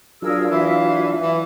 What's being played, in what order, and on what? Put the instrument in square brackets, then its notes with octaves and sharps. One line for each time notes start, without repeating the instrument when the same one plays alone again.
[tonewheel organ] F#3 D4 F4 [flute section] G#4 A#4 E6
[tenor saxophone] E3 [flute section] E5 F5
[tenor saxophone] E3